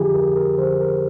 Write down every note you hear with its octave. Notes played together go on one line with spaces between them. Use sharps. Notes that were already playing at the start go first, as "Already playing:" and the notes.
Already playing: F2 D3 F3 F4 G4 G#4
F2 A#4
A#4
D3 F3 C5
A#4